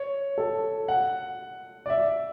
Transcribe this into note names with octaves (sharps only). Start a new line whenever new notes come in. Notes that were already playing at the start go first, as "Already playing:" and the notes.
Already playing: C#5
A4
F#5
D5
E5